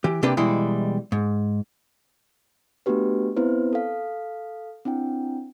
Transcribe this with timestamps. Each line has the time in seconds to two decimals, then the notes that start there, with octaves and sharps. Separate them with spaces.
0.04 E3 G4
0.23 C3 A#3 D4 G4 B4 C6
0.37 B2 E3 G3 G#3 E4
1.12 G#2
2.86 A3 B3 D4 F#4 G4 B4
3.36 B3 C4 E4 B4 C5
3.73 A4 F5
4.85 C4 D4 E4 G5